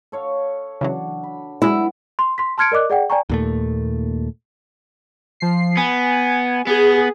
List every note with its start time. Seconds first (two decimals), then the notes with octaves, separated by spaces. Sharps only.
0.12 A4 C#5 F5
0.81 C#3 E3 F#3 D4 F#4
1.23 B5
1.62 F#3 G#3 B3 E4
2.19 C6
2.38 C6 B6
2.58 A5 C6 F6 G#6 C#7 D7
2.72 A#4 D5 D#5 D6 F#6
2.90 G#4 D5 F#5 G5
3.10 D5 G5 G#5 A#5 C#6
3.29 D#2 A#2 A3
5.40 F3 C7
5.77 B3 G#5
6.67 B3 G#4